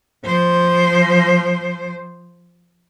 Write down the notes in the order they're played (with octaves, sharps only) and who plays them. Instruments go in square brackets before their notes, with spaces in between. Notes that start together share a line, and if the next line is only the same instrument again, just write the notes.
[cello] F3 C5